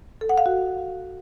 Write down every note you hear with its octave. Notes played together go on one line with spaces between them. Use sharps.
A4
F#5
F5
F#4